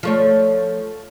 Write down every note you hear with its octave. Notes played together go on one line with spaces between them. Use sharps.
F3 A3 C#5